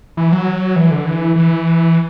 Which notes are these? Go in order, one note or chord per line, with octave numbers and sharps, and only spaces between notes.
E3
F#3
E3
D3
E3
E3